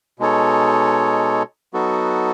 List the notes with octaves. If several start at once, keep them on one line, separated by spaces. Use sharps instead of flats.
B2 G#3 D#4 A4 C#5
F#3 B3 D#4 F#4 A4